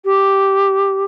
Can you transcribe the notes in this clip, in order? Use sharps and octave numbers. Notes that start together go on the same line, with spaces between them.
G4